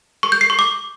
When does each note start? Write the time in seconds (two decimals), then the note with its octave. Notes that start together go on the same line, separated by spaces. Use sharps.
0.23 C#6
0.32 G6
0.41 C7
0.50 C#6
0.59 D6